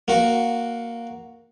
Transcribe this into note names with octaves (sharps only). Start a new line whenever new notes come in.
A#3 F#4